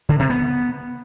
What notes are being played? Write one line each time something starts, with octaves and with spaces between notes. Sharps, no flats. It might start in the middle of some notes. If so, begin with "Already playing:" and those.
D3
C3
B3